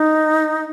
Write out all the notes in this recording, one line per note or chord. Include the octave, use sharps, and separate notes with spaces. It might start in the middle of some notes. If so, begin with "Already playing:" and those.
Already playing: D#4